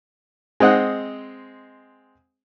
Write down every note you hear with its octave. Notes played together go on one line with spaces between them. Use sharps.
G#3 C4 D#5 F#5